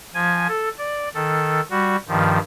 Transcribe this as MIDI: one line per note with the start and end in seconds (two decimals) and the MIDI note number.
0.14 0.47 53
0.14 0.47 80
0.48 0.69 69
0.78 1.09 74
1.14 1.61 51
1.14 1.61 69
1.70 1.96 55
1.70 1.96 66
2.08 2.39 43
2.08 2.39 51
2.08 2.39 53